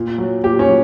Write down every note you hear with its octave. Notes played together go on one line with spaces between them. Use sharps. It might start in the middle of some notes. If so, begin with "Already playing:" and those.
Already playing: A#2
F#3
A#2 G4
C#4
F#3